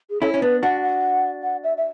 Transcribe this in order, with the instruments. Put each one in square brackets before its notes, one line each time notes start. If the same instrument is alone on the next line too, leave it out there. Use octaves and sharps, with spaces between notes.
[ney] G#4
[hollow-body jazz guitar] C#4 E4 [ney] A4
[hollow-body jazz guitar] C#4 [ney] C#5
[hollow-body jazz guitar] B3 D4 [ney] B4
[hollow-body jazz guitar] D4 F#4 [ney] F#5
[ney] F#5
F#5
E5
E5